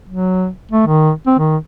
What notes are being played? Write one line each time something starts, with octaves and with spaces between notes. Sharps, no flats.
F#3
A3
D#3
C4
D#3